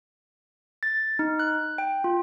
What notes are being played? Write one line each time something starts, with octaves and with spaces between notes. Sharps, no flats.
A6
D#4
F#6
G5
F4